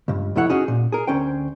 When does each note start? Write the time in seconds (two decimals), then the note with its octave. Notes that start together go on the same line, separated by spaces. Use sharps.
0.08 C#2 G2
0.36 C2 F2 A3 E4 C#5 F#5
0.49 C#4 D#4 F#4 G#4 C#5
0.68 A#2
0.92 G#4 A#4
1.07 D2 C#4 C5 G5